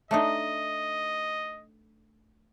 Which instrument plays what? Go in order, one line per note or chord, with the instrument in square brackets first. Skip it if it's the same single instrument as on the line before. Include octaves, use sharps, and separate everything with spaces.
[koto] A3 D4 D#4 [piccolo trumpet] D#5